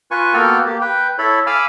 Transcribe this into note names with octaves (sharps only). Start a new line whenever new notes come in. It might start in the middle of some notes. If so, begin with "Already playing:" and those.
F4 B4 G#5 C#6
A#3 B3 F#4 A4 G5 F6
A#3 G4
B4 G5
E4 A4 C#5 B5
F5 G#5 B5 D6 E6 F6